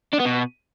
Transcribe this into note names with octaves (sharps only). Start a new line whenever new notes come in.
D4
B3
B2